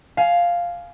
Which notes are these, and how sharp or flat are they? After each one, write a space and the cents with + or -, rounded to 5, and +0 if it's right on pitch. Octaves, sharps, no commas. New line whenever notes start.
F5 +0 G#5 +25